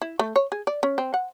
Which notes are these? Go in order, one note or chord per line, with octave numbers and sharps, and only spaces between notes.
E4
A3
C#5
G#4
D5
C#4
C4
F#5